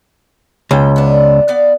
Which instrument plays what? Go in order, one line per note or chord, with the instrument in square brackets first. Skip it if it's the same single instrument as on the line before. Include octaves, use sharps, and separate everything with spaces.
[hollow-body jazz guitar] C#2 [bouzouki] B2 A#3 G5
[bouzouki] B3 D4
B3 D5 F5